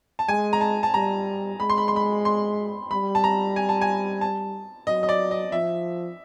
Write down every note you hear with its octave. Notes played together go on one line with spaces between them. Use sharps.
A5
G#3 G#5
A#5
A5
A5
G3 A#5
G#3 B5
C6
B5
C6
B5
C6
G3 B5
A5
A#5
G#5
A5
G#5
A5
F#3 D#5
D#5
D5
D#5
F3 E5